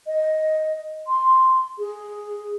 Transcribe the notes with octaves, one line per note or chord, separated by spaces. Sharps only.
D#5
C6
G#4